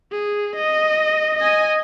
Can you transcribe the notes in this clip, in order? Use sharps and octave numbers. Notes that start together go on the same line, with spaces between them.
G#4
D#5
D#5 G#5